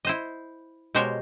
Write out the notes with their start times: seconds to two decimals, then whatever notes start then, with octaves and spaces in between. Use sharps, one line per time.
0.05 E4 C5 D#5
0.95 B2 G#3 G4 A#4 C5 C#5